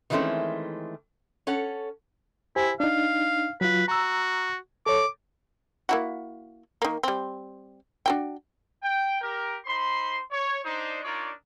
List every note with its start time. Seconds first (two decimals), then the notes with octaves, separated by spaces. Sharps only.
0.10 D#3 E3 G#3 A3 C4 C#4
1.47 C#4 A4 C#5 F#5
2.56 E4 G4 C5 G#5
2.80 D4 D#4 F5
3.61 F#3 F4 B4
3.88 F#4 A#5 E6
4.86 A4 C#5 D6
5.89 A#3 E4 F#4
6.82 D#3 A#3
7.03 G3 C4
8.06 D4 F#4 G5
8.83 G5
9.22 G4 A#4
9.66 D#4 C5 B5 C6
10.31 C#5
10.64 D4 D#4 C5
11.03 D4 D#4 F4 A#4 C#5 D5